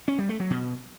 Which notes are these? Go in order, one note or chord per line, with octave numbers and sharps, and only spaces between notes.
C#4
G3
A3
F#3
B2